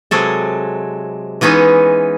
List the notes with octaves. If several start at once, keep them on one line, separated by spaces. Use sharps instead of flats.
C3 F#3 G#3 A4
E3 G#3 B3 C#4 D#4